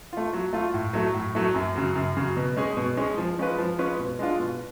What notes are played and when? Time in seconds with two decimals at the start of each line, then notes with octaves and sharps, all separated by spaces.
0.13 A3 F4
0.33 F#3
0.53 A3 F4
0.74 A2
0.93 F#3 A3
1.14 A2
1.35 F#3 A3
1.55 F#2
1.75 C#3 F#3
1.96 F#2
2.17 C#3 F#3
2.37 B2
2.56 G#3 C#4 G#4
2.77 B2
2.97 G#3 C#4 G#4
3.18 F3
3.39 G#3 C#4 F4 B4
3.58 F3
3.78 G#3 C#4 F4 B4
3.99 B2
4.19 G#3 D4 F4
4.40 B2